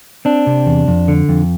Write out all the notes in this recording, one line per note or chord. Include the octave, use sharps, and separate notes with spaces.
C4 D4
C3
E2
F2
D3
F2